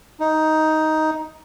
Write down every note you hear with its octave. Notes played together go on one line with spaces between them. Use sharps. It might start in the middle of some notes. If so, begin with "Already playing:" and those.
D#4